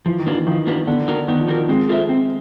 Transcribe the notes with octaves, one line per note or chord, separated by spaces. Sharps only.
E3 F3
D#3
A#3 D4 F#4 B4
E3
D#3 F3
A#3 D4 F#4 B4
D3 B3
D#4 F#4 A#4
D#3 B3
F3
D#4 F#4 A#4
G#3 C4
F4 A4 C5 E5
C4